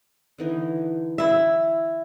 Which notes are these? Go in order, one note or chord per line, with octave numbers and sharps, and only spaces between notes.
D3 E3 D#4
E4 E5